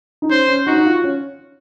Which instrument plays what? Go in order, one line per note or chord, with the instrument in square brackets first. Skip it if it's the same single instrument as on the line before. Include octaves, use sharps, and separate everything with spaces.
[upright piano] D#4
[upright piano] C#4 [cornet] C5
[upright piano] C#4
[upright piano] D#4 [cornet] F#4
[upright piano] D#4
F4
C#4